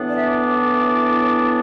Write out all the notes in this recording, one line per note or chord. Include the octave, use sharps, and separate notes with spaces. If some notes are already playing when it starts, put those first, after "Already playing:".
Already playing: A2 E3 B3 D4
D5
E5
D5